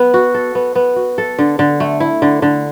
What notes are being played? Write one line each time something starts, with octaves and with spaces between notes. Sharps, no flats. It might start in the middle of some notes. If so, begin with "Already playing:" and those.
Already playing: B3
F#4
A4
B3
B3
F#4
A4
D3
D3
A3
E4
D3
D3